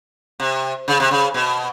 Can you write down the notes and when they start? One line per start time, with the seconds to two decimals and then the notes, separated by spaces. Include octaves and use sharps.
0.40 C3
0.88 C#3
1.00 C3
1.11 C#3
1.34 B2